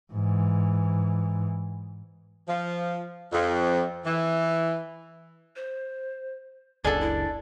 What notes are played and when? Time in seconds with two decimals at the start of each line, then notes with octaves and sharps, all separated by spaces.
0.13 G#2 E3
2.49 F3
3.32 F2
4.06 E3
5.56 C5
6.84 F#1 C#2 D4 G#4 A4 G#5
7.01 E4